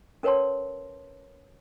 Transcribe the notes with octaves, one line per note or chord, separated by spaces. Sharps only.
C#4 A#4 B4 C#5 A5 C6